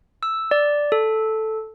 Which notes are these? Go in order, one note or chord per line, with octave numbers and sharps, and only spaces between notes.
E6
D5
A4